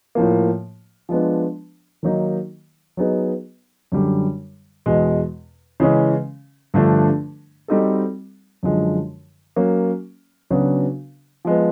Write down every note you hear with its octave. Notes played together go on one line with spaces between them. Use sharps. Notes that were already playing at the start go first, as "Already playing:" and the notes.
A2 F3 A#3
F3 G#3 B3 D4
D#3 F#3 A#3 D#4
F#3 B3 D#4 G#4
F#2 D3 G3
E2 B2 G#3
C#3 E3 G#3 C#4
G2 D3 F3 A3 D4
G3 C4 D#4 F#4 A4
F#2 D3 F3 G#3
F#3 A#3 C#4
C#3 F#3 B3 D4 F#4
F3 G#3 B3